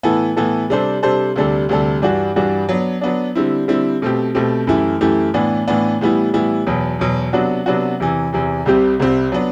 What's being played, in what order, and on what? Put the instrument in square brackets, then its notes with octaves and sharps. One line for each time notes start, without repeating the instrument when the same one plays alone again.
[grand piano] A2 E3 B3 E4 A4
A2 E3 B3 E4 A4
C3 G3 D4 A4 C5
C3 G3 D4 A4 C5
D2 C3 G3 D4 A4
D2 C3 G3 D4 A4
G2 E3 G3 D4 F#4
G2 E3 G3 D4 F#4
F#3 B3 D4
F#3 B3 D4
D3 G3 C4 E4
D3 G3 C4 E4
B2 A3 C4 G4
B2 A3 C4 G4
F#2 E3 A3 E4 G4
F#2 E3 A3 E4 G4
A2 E3 B3 D4
A2 E3 B3 D4
A2 E3 G3 B3 E4
A2 E3 G3 B3 E4
E2 B2 F#3
E2 B2 F#3
C3 F#3 B3 D4 F#4
C3 F#3 B3 D4 F#4
E2 C3 E3
E2 C3 E3
C2 C3 G3 C4 G4
C2 C3 G3 C4 G4
F#3 B3 D4